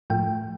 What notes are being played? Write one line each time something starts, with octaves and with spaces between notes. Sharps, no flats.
A2 F3 A3 G5